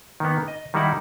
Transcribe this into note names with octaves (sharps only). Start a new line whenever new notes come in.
D#3 A#3 B3
D#5
D#3 G3 D#4 E4 F#5